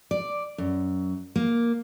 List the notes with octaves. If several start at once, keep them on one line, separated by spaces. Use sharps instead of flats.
D5
F#2
A#3